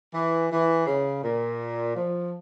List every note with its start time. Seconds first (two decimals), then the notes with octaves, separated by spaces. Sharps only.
0.14 E3
0.51 E3
0.87 C#3
1.23 A#2
1.95 F3